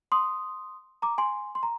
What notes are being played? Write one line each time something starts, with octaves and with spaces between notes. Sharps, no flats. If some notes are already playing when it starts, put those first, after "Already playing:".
C6 D#6
A#5 D6
G#5 C6
C6
A#5